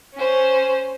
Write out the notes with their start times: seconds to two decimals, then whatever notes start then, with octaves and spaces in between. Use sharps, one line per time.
0.15 C#4 C5